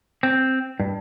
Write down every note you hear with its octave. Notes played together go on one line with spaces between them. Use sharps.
C4
G2